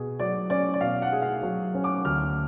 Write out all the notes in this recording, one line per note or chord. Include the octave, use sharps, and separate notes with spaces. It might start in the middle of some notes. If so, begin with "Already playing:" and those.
Already playing: B2 G#4
F#3 D5
C#4 D5
D5
B2 F5
F#5
G#4
F5
F#3
C#4
D6
D2 F6